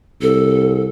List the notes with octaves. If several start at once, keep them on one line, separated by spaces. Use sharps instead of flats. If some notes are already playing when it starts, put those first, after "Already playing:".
C2 A4